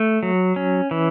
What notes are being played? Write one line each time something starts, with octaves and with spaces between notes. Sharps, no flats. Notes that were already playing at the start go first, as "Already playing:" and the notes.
Already playing: A3
F#3
C#4
E3